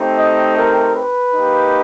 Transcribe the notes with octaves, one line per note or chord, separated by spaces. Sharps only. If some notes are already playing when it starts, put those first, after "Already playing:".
Already playing: A3 C4 D#4 G4
D#5
A#4
B4
A#3 D#4 G4